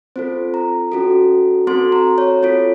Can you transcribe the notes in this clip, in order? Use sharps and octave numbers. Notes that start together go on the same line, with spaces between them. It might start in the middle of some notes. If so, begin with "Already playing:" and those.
C4 F4 A4 C5
A#5
C#4 F#4 A4
C4 F#4 A4 C6
A#5
C#5
C4 F4 A4 C#5